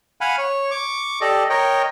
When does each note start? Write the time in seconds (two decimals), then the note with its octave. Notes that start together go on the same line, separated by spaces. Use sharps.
0.21 F5 F#5 G#5 B5
0.38 C#5
0.71 C#6 D6
1.21 G4 A4 D5 D#5
1.50 A#4 C#5 D#5 G5